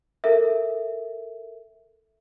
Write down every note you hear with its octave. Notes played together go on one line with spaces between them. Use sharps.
A4 A#4 E5